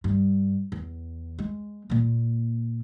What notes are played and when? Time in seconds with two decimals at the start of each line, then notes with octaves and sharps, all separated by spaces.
0.04 G2
0.72 E2
1.39 G#3
1.90 A#2 A#3